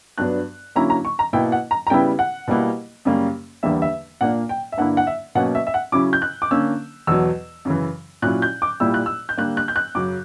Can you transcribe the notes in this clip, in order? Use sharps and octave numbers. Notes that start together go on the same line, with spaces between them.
G2 F#3 B3 D4 F#6
D3 F#3 A#3 C#4 E4 A#5
A#5
C#6
A#5
B2 A#3 E4 G5
F#5
A#5
A#5
C#3 G3 B3 E4 G5
F#5
B2 G3 A#3 E4
F#2 C#3 G3 A#3 C#4
E2 D3 G3 A#3 E5
E5
A#2 A#3 D4 F#5
G5
E5
G2 D3 A#3 E4 F#5
F#5
E5
B2 F#3 A#3 C#4 F#5
E5
E5
F#5
C#3 F#3 C#4 E4 D6
G6
F#6
D6
D3 A#3 C#4 E6
E2 B2 F#3 E6
F#2 C#3 E3
A#2 F#3 C#4 E4 F#6
G6
D6
A#2 G3 A#3 E4 E6
F#6
E6
G6
D3 G3 A#3 F#6
F#6
G6
F#6
F#2 C#3 F#3 D6